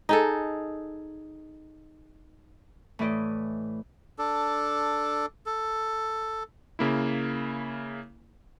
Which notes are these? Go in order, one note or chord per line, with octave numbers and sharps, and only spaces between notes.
D#4 G#4 A4
A2 E3 B4 D5 D#5
D4 A4
A4
C#3 A#3 E4